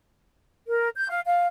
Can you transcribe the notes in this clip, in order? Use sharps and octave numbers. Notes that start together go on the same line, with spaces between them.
A#4
G6
F5
F5